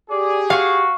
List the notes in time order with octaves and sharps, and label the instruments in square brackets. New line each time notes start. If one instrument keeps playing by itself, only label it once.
[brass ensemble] G4 G#4 [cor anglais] D5
[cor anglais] F#4 [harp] F5 C#6